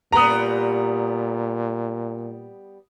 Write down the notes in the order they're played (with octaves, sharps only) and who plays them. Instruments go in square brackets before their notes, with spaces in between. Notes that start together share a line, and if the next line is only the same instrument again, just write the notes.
[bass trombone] A#2 [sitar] G3 B3 [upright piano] A#5 D#6